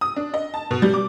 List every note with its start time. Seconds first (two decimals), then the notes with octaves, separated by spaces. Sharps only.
0.01 D#6
0.16 D4
0.34 D#5
0.54 A5
0.71 B2
0.82 G3
0.94 D6